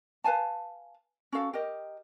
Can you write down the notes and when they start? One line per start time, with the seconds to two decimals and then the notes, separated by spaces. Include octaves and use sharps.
0.24 B4 F5 G#5 A5
1.32 C#4 F#4 A4 F5
1.53 G4 A#4 D#5